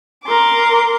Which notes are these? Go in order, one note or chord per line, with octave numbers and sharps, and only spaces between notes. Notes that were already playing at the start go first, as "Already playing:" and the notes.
A#4 C6 D6